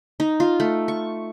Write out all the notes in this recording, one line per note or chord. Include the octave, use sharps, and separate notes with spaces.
D#4
F4
A3
C#6